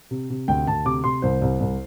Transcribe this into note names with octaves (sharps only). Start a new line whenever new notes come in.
C3
C3
D2 G5
D2 A5
C3 D6
C3 C6
C2 C5
C2
C2